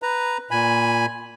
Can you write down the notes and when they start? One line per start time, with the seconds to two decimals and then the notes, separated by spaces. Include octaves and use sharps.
0.02 B4 A#5
0.51 A#2 G#5 B5